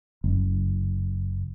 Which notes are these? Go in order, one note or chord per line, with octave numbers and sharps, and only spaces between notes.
F#1